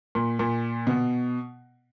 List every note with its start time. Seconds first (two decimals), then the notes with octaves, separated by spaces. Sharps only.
0.15 A#2
0.39 A#2
0.87 B2